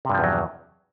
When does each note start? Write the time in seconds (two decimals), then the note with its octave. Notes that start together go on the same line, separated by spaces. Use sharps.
0.05 C3
0.10 G2
0.14 F3
0.19 E2
0.24 F#3